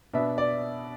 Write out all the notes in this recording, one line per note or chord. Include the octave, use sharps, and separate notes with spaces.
B2 B3 D4 E5
D5